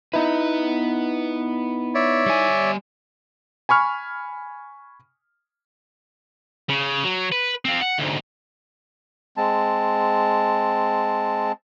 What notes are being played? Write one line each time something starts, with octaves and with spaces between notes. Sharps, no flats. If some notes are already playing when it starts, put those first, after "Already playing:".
B3 D#4 E4 B4
C#5 D5 E5
G3 G#5
G#5 B5 C#6 F6
C#3
F#3
B4
C4 F4
F#5
D2 G#2
G#3 C4 A5